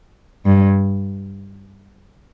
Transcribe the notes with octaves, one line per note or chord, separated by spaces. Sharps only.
G2